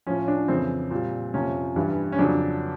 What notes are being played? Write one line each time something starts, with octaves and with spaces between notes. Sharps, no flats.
A2 F3 C#4
D4
F2 C#3 E3 C4
A#2 G3
F2 C3 F3 C#4
G2 E3 G3
C#4
F2 C#3 F#3 D4